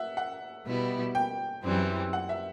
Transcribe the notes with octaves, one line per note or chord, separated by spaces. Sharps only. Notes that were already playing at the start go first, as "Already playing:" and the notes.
Already playing: E5 F#5
F#5
B2 G3 B3 E4
G5
F#2 E3 G3 C4
F#5
E5